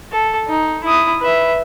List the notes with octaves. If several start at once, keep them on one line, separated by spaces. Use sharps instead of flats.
A4
D#4
E4 D#6
B4 E5